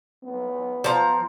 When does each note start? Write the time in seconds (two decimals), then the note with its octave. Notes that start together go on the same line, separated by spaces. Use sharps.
0.23 B3
0.84 F3 A#5